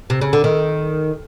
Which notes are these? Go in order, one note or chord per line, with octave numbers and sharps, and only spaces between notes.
C3
C#3
D3
D#3